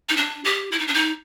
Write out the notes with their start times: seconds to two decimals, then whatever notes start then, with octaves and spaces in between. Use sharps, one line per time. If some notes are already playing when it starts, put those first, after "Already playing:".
0.09 D#4
0.17 D4
0.45 G4
0.72 E4
0.79 D#4
0.87 D4
0.94 D#4